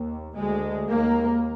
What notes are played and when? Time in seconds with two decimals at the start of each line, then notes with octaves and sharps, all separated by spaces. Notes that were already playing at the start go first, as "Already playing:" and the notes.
Already playing: D#2
0.37 D2 G#3
0.90 D#2 A#3